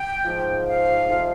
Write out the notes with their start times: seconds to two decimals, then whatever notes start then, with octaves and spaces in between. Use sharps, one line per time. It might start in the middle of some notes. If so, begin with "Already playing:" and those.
Already playing: G5
0.25 G#2 F3
0.67 F5
1.09 F2 C3 F3